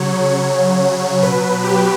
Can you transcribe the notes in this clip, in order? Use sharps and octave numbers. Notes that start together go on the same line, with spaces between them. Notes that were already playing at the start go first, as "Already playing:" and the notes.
Already playing: C#3 F#3 C#5
B2 F#3 B4
G4